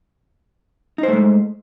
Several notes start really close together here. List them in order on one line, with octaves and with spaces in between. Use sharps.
D#4 C5 A3 G#3